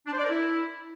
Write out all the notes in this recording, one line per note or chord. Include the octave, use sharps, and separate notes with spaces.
D4
C5
D5
A#4
E4